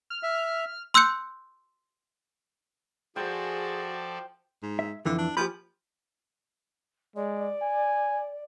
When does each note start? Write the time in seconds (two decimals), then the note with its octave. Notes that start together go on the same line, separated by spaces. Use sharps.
0.10 F6
0.23 E5
0.94 C6 E6 F#6 G6 C#7
3.16 F3 F#4 G#4 A4 C5 D5 G5
4.63 G#2
4.79 E5
5.05 F2 D3 E3
5.19 D4
5.37 F3 G4 G#5 B5
7.16 G#3 D5
7.62 G#5